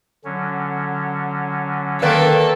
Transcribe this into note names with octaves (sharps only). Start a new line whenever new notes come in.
D3 F#3 C#4
D#3 A#3 A4 B4 D5